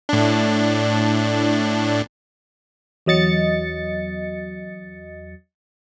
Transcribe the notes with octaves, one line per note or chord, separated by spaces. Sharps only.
A2 D4
E2 F#3 D#5 A6 C#7